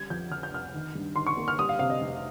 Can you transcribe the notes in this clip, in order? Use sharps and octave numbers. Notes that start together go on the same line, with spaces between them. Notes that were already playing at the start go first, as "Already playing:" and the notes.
Already playing: G3 C#4 G#6
F2 G6
F2 F6
G6
F1 F6
D#3
G2
D#3 C6
C#6
A#3
F6
G3 D#6
F5
C3 F5
D#5
F1